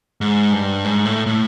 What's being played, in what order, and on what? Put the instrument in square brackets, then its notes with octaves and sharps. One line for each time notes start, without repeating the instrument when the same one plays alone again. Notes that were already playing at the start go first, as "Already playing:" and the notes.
[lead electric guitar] G#2
G2
G#2
A2
A2